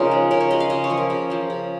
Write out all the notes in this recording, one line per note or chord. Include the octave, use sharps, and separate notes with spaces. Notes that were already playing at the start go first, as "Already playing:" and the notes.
Already playing: C#3 F3 D#4 F4 G#4 A#4
G#3
C#3 A#4
C#5
G#3 D#5
F5
C#3 D#5
C#5
F3 A#3
A#4
C#3
F3 A#3
C#3